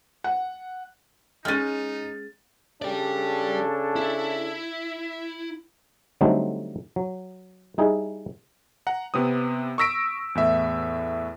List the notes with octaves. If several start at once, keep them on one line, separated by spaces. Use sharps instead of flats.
F#5
G#3 C#4 D#4 F6 A6 D#7
C#3 D4 G4 A4 D5
E4
D3 F#3 G3 A3 C4 D#4
F#3
G3 D#4 E4 G#4
F#5 A#5
C3 B3 C4 D#6
C#6 D#6 E6 A#6 B6 D7
E2 A2 E5